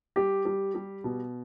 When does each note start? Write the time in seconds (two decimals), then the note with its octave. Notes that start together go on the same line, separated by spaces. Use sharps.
0.16 G3 G4
0.45 G3
0.75 G3
1.04 B2